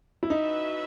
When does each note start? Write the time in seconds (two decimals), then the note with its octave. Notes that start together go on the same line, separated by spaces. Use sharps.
0.23 E4
0.30 C#4 D#4 F#4 B4 E5